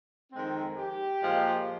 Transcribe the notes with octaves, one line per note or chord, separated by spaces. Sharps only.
F2 D#3 G#3 C4
G4
A#2 F3 G#3